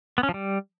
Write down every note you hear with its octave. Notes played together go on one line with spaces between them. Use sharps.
B3
C#4
F3
G3